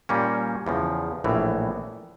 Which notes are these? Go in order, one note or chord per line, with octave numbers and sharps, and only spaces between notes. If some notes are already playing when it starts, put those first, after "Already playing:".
A#2 G3 A#3 C#4
E2 C#3 F3
A#1 A2 E3